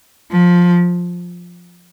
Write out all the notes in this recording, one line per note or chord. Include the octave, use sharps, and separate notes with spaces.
F3